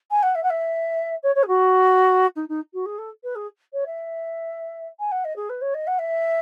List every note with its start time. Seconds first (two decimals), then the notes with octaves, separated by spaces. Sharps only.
0.11 G#5
0.23 F#5
0.35 E5
0.43 F#5
0.50 E5
1.23 C#5
1.35 C#5
1.43 G#4
1.48 F#4
2.36 D#4
2.49 D#4
2.73 F#4
2.86 G#4
2.98 A4
3.24 B4
3.36 G#4
3.73 C#5
3.86 E5
5.00 G#5
5.12 F#5
5.25 D#5
5.36 G#4
5.49 B4
5.61 C#5
5.74 D#5
5.87 F#5
5.99 E5